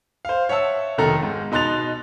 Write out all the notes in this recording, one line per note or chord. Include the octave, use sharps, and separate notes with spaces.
C5 F5
C#5 E5 F#5 A5 E6
F1 B2 D#3 A4 A#5
G#2
B2 D#4 C6 F#6 A6 F7